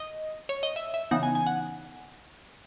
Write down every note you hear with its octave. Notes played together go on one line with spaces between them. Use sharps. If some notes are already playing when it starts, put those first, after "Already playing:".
Already playing: D#5
C#5
D#5
E5
E5
C#3 E3 B3 D#4 F#5
G#5
G#5
F#5